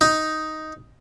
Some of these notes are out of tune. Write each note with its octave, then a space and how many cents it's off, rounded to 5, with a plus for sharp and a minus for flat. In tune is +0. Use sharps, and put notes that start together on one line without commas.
D#4 +5